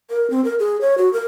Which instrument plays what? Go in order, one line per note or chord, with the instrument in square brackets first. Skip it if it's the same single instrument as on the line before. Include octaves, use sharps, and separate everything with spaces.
[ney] A#4
C4
A#4
G#4
C#5
F#4
A#4